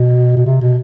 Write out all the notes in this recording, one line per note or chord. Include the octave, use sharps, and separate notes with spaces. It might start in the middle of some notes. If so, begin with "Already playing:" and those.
Already playing: B2
B2
C3
B2